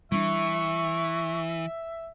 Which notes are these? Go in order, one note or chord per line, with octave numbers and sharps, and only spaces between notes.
E3 G3 A3 D4 E5 C#6